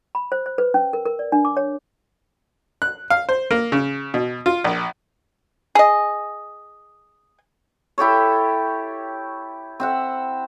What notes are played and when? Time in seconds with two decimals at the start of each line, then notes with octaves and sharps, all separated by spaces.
0.15 B5
0.32 C5
0.46 C5
0.58 B4
0.74 C#4
0.93 A#4
1.06 A#4
1.19 D5
1.32 D4
1.45 D6
1.57 C#5
2.82 F#6
3.10 F5
3.29 C5
3.51 A#3
3.72 C#3
4.14 B2
4.46 F4
4.64 A#1
5.75 G#4 D#5
7.98 E4 G4 A4 C#5
9.80 C4 E5 F#5